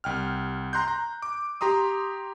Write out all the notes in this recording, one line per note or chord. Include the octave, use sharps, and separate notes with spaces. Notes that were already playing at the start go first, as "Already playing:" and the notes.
C2 G5 F6
A#5 C6 F#6 G6
A#5
D6
G4 A#5 C6 D#6